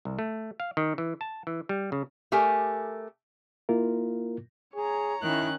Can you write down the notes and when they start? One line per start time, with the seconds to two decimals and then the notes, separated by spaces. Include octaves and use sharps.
0.05 C2
0.19 A3
0.60 F5
0.77 D#3
0.98 E3
1.21 A5
1.47 E3
1.69 G3
1.92 C#3
2.32 A3 G4 A#4 G#5
3.69 A#3 E4 F4 A#4
4.75 G#4 C#5 A#5
5.23 D#3 C#4 E4 F#6